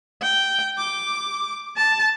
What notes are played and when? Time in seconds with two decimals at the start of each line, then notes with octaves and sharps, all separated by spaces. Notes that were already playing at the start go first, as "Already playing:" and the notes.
0.22 G5
0.78 D6
1.77 A5